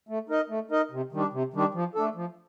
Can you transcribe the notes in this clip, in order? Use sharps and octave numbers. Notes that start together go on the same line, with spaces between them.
A3
D#4 A#4 D#5
A3
D#4 A#4 D#5
C3
D#3 G3 D4
C3
D#3 G3 D4
F3
A3 D4 A4
F3